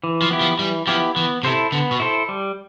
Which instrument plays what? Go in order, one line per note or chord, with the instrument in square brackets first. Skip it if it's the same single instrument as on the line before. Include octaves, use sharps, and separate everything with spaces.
[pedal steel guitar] E3
[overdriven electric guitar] F3
[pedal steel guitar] B3 E4 G4
[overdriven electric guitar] F3
[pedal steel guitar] E3 [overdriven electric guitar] G3
[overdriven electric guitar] F3 [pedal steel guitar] B3 E4 G4
[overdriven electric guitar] E3 [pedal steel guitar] B3
[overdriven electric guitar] C3 [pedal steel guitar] E4 A4 C5
[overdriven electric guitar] D3 [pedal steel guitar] B3
[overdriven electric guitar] B2
[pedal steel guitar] E4 A4 C5
G3